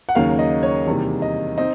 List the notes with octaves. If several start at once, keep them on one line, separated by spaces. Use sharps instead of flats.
F#5
D#2 C#3 F#3 A#3 F5
D#5
C#5
E2 C3 D#3 G3 A#3
D#5
C4 D#4 D#5